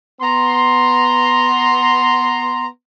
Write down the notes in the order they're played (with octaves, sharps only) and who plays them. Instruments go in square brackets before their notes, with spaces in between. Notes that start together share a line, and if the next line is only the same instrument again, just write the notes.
[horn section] B3 A#5 C6